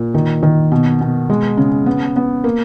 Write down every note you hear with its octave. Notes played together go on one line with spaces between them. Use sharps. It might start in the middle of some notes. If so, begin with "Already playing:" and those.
Already playing: A#2
D#3
D#3
B2
B2
G#3
C#3
B3
B3
A#3